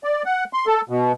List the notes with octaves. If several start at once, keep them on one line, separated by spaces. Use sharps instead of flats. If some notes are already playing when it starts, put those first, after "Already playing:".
D5
F#5
C6
A4
B2